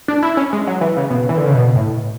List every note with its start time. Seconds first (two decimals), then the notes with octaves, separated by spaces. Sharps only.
0.08 D4
0.23 E4
0.37 C#4
0.53 G#3
0.67 F#3
0.81 E3
0.96 C#3
1.10 B2
1.29 E3
1.37 D3
1.46 C#3
1.54 B2
1.75 A2